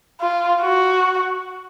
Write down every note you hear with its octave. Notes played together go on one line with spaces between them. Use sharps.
F4
F#4